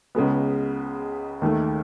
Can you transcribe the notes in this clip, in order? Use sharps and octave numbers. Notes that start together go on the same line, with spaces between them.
C#2 C#3 G#3 B3
D#2 D#3 A3